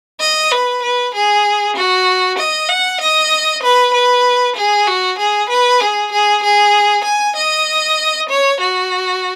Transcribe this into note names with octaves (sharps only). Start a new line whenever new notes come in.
D#5
B4
B4
G#4
F#4
D#5
F#5
D#5
B4
B4
G#4
F#4
G#4
B4
G#4
G#4
G#4
G#5
D#5
C#5
F#4